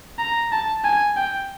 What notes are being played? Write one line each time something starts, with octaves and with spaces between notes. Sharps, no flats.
A#5
A5
G#5
G5